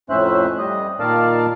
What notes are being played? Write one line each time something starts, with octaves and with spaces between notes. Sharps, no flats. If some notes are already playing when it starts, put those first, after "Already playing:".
F2 A2 C#4 C5 E5 F#6
G3 D#5
A#2 D#3 A#4 D5 F5 A5